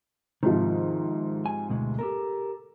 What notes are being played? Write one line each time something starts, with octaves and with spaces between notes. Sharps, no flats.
G#2 C3 D#3 F3
G#5
D2 B2 G#3
G4 A4 A#4